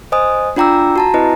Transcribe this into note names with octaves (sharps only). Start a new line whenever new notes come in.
C5 D#5 G#5 D#6
D4 F4 G5 A#5 D6 E6
F#4 A5 A#5
C4 E4 B4 D#5